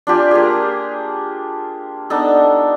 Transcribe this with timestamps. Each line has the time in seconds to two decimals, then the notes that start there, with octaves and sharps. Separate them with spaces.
0.07 D4 F4 G4 G#5
0.31 A#3 F4 G4 G#4
2.10 B3 D4 D#4 A4